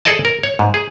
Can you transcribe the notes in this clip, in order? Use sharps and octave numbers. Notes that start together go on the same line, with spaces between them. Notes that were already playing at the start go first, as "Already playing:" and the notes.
G#4 A4 D5 D#5 A5
A#4
C#5
G#2
G#4